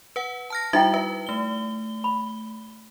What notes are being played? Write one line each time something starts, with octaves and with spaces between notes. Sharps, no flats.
B4 F#5
A5 F6 A#6
G3 D#4 E4 F#4 E5 G5
B4 E5
A3 G7
B5